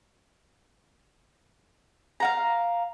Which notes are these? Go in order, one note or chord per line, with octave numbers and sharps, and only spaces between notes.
F5 F#5 A#5